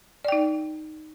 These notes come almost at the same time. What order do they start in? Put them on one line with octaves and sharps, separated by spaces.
D5 G5 D#4